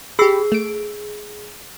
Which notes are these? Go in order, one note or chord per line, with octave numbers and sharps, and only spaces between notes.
G4 G#4 B5 E6 C7
A3 D7